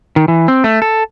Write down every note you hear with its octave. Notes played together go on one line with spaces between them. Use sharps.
D#3
E3
C4
A3
A4